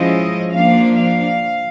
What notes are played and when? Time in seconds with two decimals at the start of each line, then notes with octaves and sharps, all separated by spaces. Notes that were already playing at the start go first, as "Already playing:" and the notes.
Already playing: F3 G#3 C#4 E4 D#5
0.52 F3 A#3 D4 F5
0.97 F5